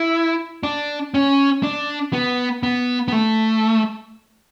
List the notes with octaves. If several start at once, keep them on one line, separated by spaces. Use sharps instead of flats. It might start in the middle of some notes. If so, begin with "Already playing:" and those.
Already playing: E4
D4
C#4
D4
B3
B3
B3
A3